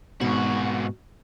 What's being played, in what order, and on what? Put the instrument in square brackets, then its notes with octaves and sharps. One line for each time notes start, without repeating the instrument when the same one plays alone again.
[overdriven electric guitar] G#2 F#4 [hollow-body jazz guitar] B2